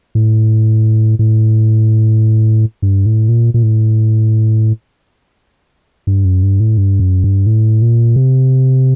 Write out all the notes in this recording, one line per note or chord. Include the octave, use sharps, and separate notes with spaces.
A2
A2
G2
A2
A#2
A#2
A2
G2
F#2
G2
A2
G2
F#2
G2
A2
A#2
C3